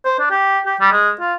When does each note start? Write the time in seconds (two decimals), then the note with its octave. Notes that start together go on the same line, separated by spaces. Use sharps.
0.05 C5
0.19 D4
0.30 G4
0.66 G4
0.81 G3
0.92 G#3
1.20 F4